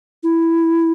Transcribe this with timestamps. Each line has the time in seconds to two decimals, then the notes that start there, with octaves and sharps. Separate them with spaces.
0.23 E4